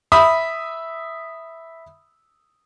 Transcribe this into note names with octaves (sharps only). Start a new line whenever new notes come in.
E5 B5 D#6